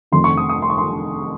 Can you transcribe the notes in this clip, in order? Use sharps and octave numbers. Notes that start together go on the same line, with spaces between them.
F1 F2 D#3 C6
C#6
D#6
D#6
C6
C#6
C6